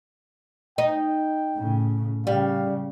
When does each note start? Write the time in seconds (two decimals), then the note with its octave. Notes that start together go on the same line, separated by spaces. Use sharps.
0.78 D#4 G5
1.56 A2 C#3
2.27 C#3 G3 F5